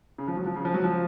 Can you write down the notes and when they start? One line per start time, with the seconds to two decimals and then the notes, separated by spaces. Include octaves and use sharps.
0.18 C#3
0.28 F3
0.37 F#3
0.46 F3
0.56 C#3
0.65 F3
0.74 F#3
0.84 F3